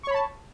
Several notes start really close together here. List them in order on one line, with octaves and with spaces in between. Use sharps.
C#6 C#5 B5 A5